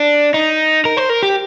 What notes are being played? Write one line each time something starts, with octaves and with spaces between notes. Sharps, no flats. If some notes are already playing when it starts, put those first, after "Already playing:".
Already playing: D4
D#4
A#4
C5
A#4
G4